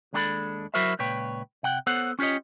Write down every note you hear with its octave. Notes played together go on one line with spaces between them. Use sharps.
D#2 G#3 D4 F#4 A4 B5
F#3 E4 F#4 A#4 C5 E5
C#2 A#2 B4 C#5 G5
C3 F#5 G5
B3 A4 C5 C#5 F#5
C#4 F4 G4 C#5 D#5